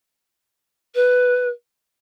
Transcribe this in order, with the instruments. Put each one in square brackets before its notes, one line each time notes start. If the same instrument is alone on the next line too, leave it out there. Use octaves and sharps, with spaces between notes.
[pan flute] B4